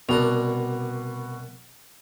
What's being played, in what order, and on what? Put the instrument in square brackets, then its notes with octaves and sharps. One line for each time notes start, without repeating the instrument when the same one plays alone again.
[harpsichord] C2 D4 A#4 [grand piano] B2 B3 F7